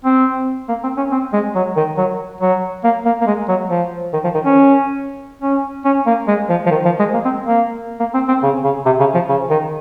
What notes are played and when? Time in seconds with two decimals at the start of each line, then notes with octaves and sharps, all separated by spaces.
0.05 C4
0.68 A#3
0.83 C4
0.97 C#4
1.12 C4
1.33 G#3
1.55 F#3
1.76 D#3
1.98 F#3
2.41 F#3
2.84 A#3
3.05 A#3
3.21 A#3
3.26 G#3
3.48 F#3
3.70 F3
4.13 D#3
4.24 F3
4.35 D#3
4.45 C#4
5.42 C#4
5.85 C#4
6.06 A#3
6.28 G#3
6.49 F3
6.66 F3
6.71 D#3
6.85 F3
6.99 G#3
7.14 A#3
7.25 C4
7.46 A#3
8.00 A#3
8.14 C4
8.28 C4
8.43 C#3
8.64 C#3
8.85 C3
9.00 C#3
9.14 F3
9.29 C#3
9.50 D#3